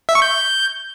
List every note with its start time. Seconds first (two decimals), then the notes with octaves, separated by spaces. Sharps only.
0.09 E5
0.15 C#6
0.22 G6